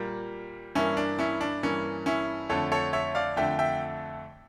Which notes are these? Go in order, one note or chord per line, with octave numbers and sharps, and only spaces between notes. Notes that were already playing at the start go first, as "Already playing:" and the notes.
Already playing: A#2 G3 A#3
G2 E3 A#3 C#4 E4
D4
C#4 E4
D4
G2 E3 A#3 C#4
C#4 E4
F2 D3 A3 A4 C#5
A4 C#5
C#5 E5
D5 F5
F2 D3 A3 E5 G5
E5 G5